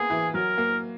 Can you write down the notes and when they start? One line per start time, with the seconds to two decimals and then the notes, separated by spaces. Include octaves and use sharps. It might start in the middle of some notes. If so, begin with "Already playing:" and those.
Already playing: A#3 B3 G#4
0.10 E3
0.34 F#3 A#4
0.58 A#3